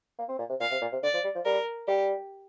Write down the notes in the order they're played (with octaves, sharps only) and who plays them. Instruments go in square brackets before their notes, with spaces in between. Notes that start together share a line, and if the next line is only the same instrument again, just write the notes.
[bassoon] A#3
C4
A#2
C3
[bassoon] A#2 [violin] F5
[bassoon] C3
A#2
C3
[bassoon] D3 [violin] D5
[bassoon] F3
G3
F3
[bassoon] G3 [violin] A#4
[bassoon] G3 [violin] G4